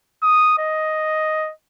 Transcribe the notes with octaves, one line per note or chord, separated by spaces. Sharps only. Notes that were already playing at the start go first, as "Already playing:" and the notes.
D#6
D#5